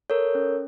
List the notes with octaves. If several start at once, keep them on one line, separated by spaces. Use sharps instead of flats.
A4 A#4 C#5
C#4